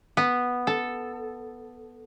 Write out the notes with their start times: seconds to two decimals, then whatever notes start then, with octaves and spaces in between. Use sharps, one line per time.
0.17 B3
0.67 A4